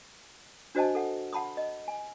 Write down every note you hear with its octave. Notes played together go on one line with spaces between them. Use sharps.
D4 F#4 C5 D#5 G#5 A5
A4 F#5
F#5 A5 B5 C6 D#6
D#5
G#5